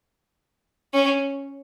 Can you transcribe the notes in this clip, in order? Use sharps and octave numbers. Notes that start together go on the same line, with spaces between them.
C#4